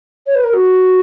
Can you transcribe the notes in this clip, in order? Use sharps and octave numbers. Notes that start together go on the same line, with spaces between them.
C#5
B4
A#4
F#4